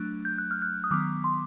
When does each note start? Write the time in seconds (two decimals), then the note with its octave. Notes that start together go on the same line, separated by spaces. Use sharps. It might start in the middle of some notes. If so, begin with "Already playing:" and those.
Already playing: F#3 A3 D4 F#6
0.25 G6
0.38 F#6
0.51 F6
0.62 F#6
0.84 D#6
0.91 D#3 F#3 B3 D6
1.24 C6